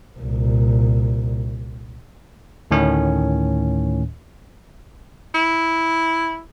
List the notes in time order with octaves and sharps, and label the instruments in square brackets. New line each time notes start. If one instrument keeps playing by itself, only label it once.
[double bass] C2 A#2
[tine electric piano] D2 A2 D#3 C#4
[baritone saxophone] E4